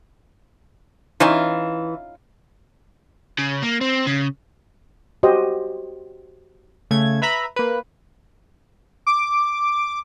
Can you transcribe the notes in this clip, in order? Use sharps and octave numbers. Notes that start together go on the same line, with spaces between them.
E3 C#4 D#4 F4
C#3
A#3
C4
C#3
F#4 G4 C5 D#5
C#3 A3 G#6
B4 E5 A#5 B5
A#3 B4
D6